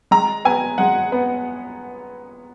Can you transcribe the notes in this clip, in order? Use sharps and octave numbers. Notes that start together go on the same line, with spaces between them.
G#3 A#5
B3 G#5
G#3 F#5
B3